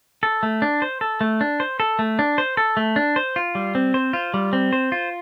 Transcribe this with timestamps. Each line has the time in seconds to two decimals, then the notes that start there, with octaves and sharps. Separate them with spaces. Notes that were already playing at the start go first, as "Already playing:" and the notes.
0.23 A4
0.43 A3
0.62 D4
0.82 C5
1.01 A4
1.21 A3
1.41 D4
1.60 C5
1.80 A4
1.99 A3
2.19 D4
2.38 C5
2.57 A4
2.77 A3
2.96 D4
3.16 C5
3.36 F4
3.55 G3
3.75 C4
3.94 C5
4.13 F4
4.34 G3
4.53 C4
4.73 C5
4.92 F4